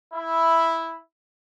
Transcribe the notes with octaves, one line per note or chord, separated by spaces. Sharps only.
E4